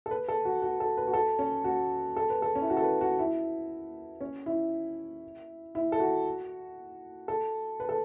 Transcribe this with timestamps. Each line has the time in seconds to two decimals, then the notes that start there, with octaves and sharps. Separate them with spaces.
0.06 A4
0.11 B4
0.28 A4
0.45 F#4
0.62 F#4
0.80 A4
0.97 B4
1.07 F#4
1.13 A4
1.39 C#4
1.64 F#4
2.16 A4
2.30 B4
2.42 A4
2.55 C#4
2.62 E4
2.70 F#4
2.77 A4
2.84 B4
3.01 F#4
3.19 E4
4.21 C#4
4.46 E4
5.75 E4
5.92 A4
6.00 F#4
7.28 A4
7.80 B4
7.89 A4